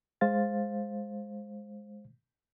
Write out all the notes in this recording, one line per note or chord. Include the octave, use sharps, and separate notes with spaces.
G#3 C5 F5 A6